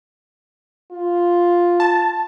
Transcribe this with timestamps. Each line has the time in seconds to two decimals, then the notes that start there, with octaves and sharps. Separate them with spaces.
0.91 F4
1.80 A5